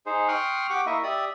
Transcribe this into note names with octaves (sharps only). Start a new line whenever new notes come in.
D#4 G#4 C5
G5 C6 C#6 D#6 F6 F#6
G4 F#5 G5 C#6 D6
A#3 E4 D#5 E5 C#6
G4 D5 E5 D#6